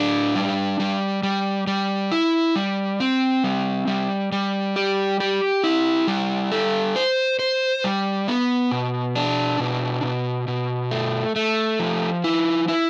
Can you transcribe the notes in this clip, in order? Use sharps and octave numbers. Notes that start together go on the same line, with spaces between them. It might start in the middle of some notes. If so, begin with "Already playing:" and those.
Already playing: A2 D4
G3
G3
G3
G3
E4
G3
C4
G3
G3
G3
G4
G4
E4
G3
A4
C5
C5
G3
B3
B2
D4
B2
B2
B2
A3
A3
F3
E4
E4